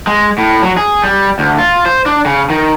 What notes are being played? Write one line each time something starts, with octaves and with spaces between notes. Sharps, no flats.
G#3
A2
F#3
G#4
G3
D2
F4
C5
D4
C#3
D#3